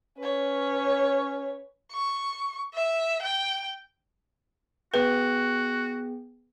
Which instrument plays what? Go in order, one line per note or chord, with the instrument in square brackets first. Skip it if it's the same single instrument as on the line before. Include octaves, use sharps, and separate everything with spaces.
[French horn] C#4 [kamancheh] B4 C#5
[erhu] C#6
E5
G5
[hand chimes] B3 G#4 G5 [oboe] F#4 [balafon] B4